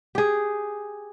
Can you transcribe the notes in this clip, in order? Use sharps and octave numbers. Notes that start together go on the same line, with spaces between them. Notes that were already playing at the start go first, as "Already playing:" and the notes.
G4 G#4